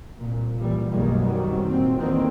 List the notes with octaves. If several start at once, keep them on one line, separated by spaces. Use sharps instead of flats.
C2 A#2
C#2 A#2 E3 G3
B1 F#2 D#3 G3 G#3 A#3
C3 D#3 F#3 G3
A#2 C4
E2 D3 D#3 A#3 C4